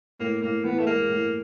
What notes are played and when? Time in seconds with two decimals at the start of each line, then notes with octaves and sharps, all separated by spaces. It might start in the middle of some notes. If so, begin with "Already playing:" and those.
0.20 A2 A#3
0.42 A2 A#3
0.64 E3 B3
0.79 A3
0.87 G#3 A#3
1.08 A2